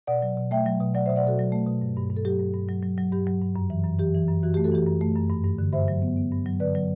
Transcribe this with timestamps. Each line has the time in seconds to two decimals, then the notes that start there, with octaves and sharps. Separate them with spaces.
0.07 B2 D5 F#5
0.22 F#3
0.37 B2
0.51 A3 E5 G5
0.66 F#3
0.80 B2
0.94 F#3 D5 F#5
1.06 B2 C5 E5
1.16 D5 F#5
1.24 B2 F#4 A4
1.39 F#3
1.52 A3
1.67 B2
1.82 G2
1.97 G2
2.11 G2
2.17 A4
2.25 F#3 G4
2.40 G2
2.54 G2
2.69 F#3
2.83 F#3
2.98 F#3
3.12 G2 G4
3.27 F#3
3.42 G2
3.56 F#2
3.70 E3
3.84 F#2
3.99 E3 G4
4.14 E3
4.28 F#2
4.43 E3 F#4
4.54 A3 G4
4.64 F#4 A4
4.72 E3 G4
4.87 F#2
5.01 A3
5.15 F#2
5.30 G2
5.44 G2
5.59 D3
5.73 G2 C5 E5
5.88 F#3
6.02 B3
6.17 B3
6.32 G2
6.46 F#3
6.60 D3 B4 D5
6.75 F#3